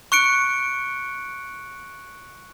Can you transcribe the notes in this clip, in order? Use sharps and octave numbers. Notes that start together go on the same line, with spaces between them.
C#6 F#6 C#7 D7